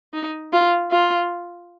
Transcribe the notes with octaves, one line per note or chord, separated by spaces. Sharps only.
D#4
F4
F4